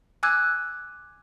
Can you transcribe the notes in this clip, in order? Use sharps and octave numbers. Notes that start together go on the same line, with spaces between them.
G#5 D6 E6 F#6 G#6